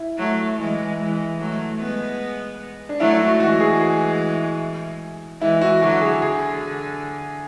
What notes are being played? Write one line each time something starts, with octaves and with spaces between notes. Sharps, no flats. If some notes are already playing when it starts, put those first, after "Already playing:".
Already playing: E4
F#3 A3
E3 G#3
E3 G#3
F#3 A3
G#3 B3
D4
F#3 A3 E4
F#4
E3 G#3 F#4
G#4
G#4
E3 G#3 E4
F#4
D3 F#3 F#4
G#4
D3 G#4